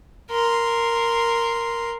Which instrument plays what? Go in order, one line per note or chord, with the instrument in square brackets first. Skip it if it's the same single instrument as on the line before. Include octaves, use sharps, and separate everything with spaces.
[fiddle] A#4 C6